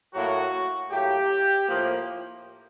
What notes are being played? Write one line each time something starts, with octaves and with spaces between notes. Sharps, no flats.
A2 F#3 A#3 F#4
A2 F#3 A#3 G4
A2 F3 A#3